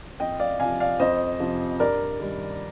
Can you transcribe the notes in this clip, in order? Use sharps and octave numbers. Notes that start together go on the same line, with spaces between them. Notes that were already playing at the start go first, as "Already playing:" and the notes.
F2 D#5 G5
D5 F5
C3 F3 F5 G#5
D5 F5
F2 C5 D#5
C3 F3
G2 A#4 D5
D#3 G3